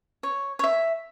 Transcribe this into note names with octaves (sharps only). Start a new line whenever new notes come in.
C#5
C#5
E5